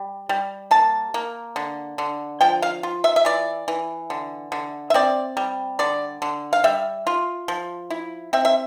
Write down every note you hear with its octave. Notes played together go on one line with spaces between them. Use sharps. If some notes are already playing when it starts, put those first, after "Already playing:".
Already playing: G3
G3
A#3 A5
A#3
D3
D3
F3 G5
F5
F4
E5
E5
E3 D5
E3
D3
D3
E5
C4 D5
G3
D3 D5
D3
F5
G3 E5
F4
F3
E4
C4 E5
E5